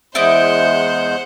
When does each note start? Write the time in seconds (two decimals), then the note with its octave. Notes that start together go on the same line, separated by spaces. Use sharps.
0.15 E2 G#3 E4 C5 D5 D#5 F#5 G6